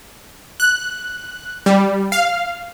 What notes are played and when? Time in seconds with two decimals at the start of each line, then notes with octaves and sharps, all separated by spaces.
0.60 F#6
1.66 G3
2.12 F5